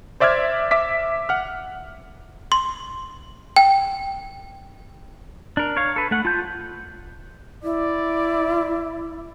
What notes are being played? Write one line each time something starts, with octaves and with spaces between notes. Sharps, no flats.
C5 D5 E5 D6 F6 G#6
E5 D6 B6
F#5 F6
C6
G5
D4 A#4
C#5 F5
A4 B4
A3 F#5
F4 A5 G6
E4 D5